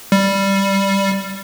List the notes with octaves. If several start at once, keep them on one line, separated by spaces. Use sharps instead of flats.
G3